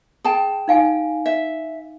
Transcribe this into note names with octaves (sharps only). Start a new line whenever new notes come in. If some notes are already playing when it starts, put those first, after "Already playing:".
G#4 G5 A5
D#4 F5 G#5
E5